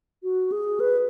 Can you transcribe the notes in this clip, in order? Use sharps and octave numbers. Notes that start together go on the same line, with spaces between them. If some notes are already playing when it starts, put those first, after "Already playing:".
F#4
G#4
B4